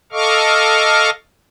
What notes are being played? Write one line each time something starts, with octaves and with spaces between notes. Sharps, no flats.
A4 D#5 F5 C#6 D6 F6